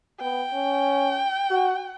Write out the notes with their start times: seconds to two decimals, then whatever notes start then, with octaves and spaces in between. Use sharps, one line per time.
0.20 B3 G5
0.53 C#4
1.50 F#4